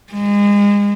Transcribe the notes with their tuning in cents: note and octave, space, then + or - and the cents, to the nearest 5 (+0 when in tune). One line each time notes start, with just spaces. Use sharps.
G#3 -30